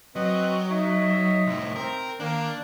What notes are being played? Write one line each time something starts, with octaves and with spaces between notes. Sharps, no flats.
F#3 C4 B4 D#5
D#4 C#5 D#5 E5
C2 A2
C4 A#4
D#3 A#3 D4